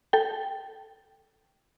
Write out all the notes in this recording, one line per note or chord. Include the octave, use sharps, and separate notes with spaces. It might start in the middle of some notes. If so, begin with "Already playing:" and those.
A4 G5